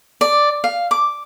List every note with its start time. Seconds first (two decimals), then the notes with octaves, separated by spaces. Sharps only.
0.21 D5
0.64 F5
0.91 D6